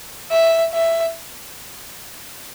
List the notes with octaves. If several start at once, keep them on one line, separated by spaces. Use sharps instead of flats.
E5
E5